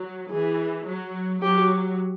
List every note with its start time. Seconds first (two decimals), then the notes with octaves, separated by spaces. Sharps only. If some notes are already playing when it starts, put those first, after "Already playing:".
Already playing: F#3
0.30 E3 G#4
0.87 F#3
1.43 F#3 G4